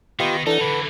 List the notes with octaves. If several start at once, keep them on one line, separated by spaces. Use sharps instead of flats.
D#3 B3 F4 G4 D#5 F5
E3 D4 D#4 A4 F#5
D3 E3 B4